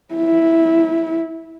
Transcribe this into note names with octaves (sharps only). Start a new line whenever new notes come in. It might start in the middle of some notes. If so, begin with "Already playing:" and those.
E4